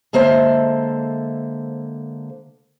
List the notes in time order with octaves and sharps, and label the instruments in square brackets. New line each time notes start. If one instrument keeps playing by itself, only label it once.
[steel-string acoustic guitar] D3 G#3 A#3 A4 C5 E5